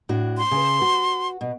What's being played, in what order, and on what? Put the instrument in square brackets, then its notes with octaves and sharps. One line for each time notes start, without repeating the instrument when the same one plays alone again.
[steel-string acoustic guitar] A2 D4 F#4
[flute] C6
[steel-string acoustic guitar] C#3 B4
F#4
B2